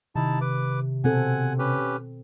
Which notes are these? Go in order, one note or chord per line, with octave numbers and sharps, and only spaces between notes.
C3 D#3 D#4 E4 A5
B4 D6
B2 C4 A4 F#5 G#5
C#4 G4 B4